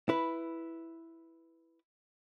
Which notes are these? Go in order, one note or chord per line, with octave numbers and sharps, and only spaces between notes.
E4 B4